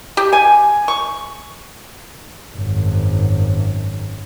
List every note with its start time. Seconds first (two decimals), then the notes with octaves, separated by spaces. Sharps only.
0.17 G4
0.33 G#5
0.88 C#6
2.54 G#1 F#2